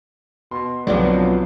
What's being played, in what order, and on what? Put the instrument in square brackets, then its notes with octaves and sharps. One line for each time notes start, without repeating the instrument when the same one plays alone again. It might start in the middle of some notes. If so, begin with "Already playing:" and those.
[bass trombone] B2 [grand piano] C6
[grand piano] B1 F2 D3 [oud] F3 B3 D4 [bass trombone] F#3